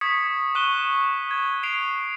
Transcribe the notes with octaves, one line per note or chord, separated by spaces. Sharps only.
C#6 D#6 G#6 B6 C#7
C#6 F#6 D#7 G7
G#6
C7 D7 F7